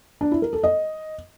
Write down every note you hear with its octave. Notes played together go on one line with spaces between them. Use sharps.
D4
E4
A#4
A4
D#5